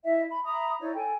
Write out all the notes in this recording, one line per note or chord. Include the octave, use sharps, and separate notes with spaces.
E4 D#5 E5
B5
E5 A#5 B5 D#6
D#4 E4 C#5 D5
A4 G5 G#5